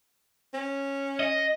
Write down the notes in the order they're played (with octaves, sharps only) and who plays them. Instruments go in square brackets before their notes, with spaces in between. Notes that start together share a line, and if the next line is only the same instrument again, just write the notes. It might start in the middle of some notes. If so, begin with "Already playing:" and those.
[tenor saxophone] C#4
[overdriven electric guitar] D#5